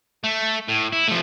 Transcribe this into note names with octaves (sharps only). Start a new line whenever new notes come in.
A3
A2
E4
F3 A3